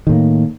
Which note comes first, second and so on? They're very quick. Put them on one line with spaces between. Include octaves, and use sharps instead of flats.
D#3 A2 A#3